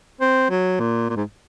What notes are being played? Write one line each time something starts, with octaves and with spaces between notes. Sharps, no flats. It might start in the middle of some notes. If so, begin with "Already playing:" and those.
C4
F#3
A#2
A#2
G#2